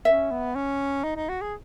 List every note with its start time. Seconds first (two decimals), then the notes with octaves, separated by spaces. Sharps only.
0.05 C#4 E5
0.31 B3
0.55 C#4
1.04 D#4
1.16 D#4
1.29 F#4
1.41 G#4